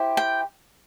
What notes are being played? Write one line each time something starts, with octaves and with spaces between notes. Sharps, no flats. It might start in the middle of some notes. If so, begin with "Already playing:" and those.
Already playing: E4 G4 C5
G5